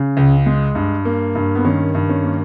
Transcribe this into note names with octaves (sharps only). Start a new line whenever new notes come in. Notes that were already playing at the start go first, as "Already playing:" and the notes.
Already playing: C#3
C#2
G#3
G2
A#3
G2
B3
D#3 C#4
G2
C#4
A#3